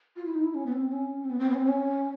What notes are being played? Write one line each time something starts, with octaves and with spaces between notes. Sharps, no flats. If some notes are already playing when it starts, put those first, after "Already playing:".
F4
E4
D#4
E4
C#4
B3
C4
C#4
C4
B3
C4
B3
C#4
C4
C#4